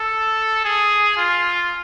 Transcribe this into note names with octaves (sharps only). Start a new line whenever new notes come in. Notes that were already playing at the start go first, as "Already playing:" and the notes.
Already playing: A4
G#4
F4